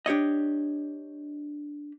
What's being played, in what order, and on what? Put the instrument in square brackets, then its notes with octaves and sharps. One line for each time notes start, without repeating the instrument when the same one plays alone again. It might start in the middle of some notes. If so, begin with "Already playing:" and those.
[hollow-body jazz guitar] D4 G4 C#5 D#5